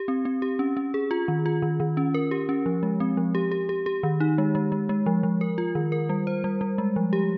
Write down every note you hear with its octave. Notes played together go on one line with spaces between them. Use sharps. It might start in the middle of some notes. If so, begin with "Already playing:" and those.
Already playing: G4
C4
C4
G4
C#4
C#4
G#4
F4
D#3
F4
D#3
D#3
C#4
A#4
G4
C#4
F3
G#3
C4
F3
G4
G4
G4
G4
D#3
D#4
G#3
G#3
G#3
G#3
F3
F3
A#4
F4
D#3
A#4
G3
C5
G3
G3
G#3
F3
G4